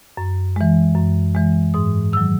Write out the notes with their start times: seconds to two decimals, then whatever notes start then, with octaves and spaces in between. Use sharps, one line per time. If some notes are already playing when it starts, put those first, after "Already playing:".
0.17 F#2
0.56 E3 G#3
0.95 F#2
1.35 E3 G#3
1.74 G#2 D#6
2.13 D#3 F#3 E6